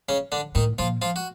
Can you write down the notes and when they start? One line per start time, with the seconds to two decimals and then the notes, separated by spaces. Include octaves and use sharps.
0.09 C#3 C#4
0.32 D3 D4
0.55 A2 D#3 D#4
0.79 A#2 F3 F4
1.02 F3 F4
1.16 F#4